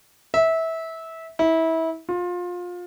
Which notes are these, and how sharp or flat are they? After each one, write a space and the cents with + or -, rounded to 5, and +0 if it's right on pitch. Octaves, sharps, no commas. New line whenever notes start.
E5 -20
E4 -25
F4 +25